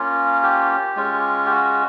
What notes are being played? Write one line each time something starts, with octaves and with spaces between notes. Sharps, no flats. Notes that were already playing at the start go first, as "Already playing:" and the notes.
Already playing: A#3 C#4 F4
G4
G#3 C#4 F4
G4
F#4